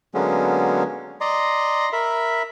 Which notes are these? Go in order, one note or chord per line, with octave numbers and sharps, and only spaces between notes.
D3 F#3 G#3 A#3 B3 C#4
D5 D#5 A#5 C6
A#4 E5 B5